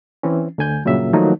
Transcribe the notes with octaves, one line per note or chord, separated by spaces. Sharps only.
E3 C4 C#4
D2 D3 G#5 G6
G2 A#2 C#3 F#3 E5
D#3 F3 F#3 A3 A#3 D#4